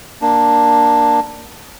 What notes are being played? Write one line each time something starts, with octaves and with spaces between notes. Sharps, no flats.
A#3 D4